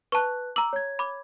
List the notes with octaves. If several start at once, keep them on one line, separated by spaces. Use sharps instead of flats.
B4 A5 C#6 F#6
A#5 D6 E6 F#7
C#5 G#6
B5 D6